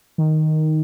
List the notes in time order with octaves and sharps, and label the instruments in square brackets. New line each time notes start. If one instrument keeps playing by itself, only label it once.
[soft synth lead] D#3